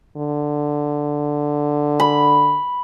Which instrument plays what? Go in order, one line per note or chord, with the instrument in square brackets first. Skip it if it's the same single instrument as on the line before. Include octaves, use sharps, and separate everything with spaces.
[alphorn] D3
[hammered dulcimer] B5